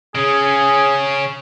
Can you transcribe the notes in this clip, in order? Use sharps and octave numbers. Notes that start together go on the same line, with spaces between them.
C#3 C#4 G#4